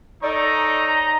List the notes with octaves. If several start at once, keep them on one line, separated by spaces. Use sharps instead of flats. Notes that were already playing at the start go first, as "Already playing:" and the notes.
D#4 A4 C#5 D5 A#5